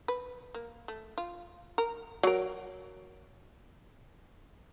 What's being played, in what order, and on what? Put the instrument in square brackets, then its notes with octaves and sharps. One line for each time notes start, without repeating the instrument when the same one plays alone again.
[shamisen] B4
A#3
A3
F4
A#4
F#3 A#4